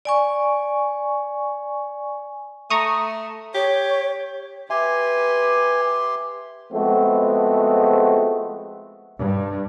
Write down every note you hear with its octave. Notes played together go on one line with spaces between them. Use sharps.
D5 G#5 C#6
A3 A#5 C#6 D#6
G4 C#5
G4 B4 E5 G#5 C6
F3 G#3 A3 B3 C4 F#4
G2